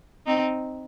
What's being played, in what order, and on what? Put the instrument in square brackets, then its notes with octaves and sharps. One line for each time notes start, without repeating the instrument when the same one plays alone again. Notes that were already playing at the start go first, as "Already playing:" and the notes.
[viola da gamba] C4 D#4